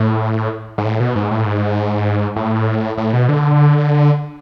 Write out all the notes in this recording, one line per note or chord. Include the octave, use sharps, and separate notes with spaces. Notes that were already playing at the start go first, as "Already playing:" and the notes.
Already playing: A2
G#2
A2
B2
G#2
A2
G#2
A2
A2
B2
D3